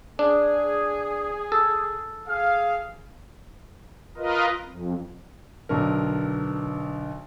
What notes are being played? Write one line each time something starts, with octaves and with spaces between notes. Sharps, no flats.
D4 G#4
A4
G#4 F5
F4 A#4 B4 D#5
F2
B1 D3 A#4